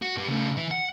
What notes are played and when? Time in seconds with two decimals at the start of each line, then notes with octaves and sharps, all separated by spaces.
0.02 F#4
0.16 G2 G3
0.29 C#3 A3
0.57 E3
0.71 F#5